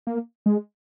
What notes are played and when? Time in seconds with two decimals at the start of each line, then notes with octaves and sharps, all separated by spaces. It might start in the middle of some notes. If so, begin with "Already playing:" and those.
0.07 A#3
0.46 G#3